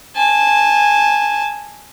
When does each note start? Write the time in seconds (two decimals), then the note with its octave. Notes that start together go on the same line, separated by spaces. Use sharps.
0.16 G#5 A5